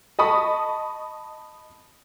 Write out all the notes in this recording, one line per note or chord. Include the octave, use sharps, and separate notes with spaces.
D#5 A5 B5 C#6 D#6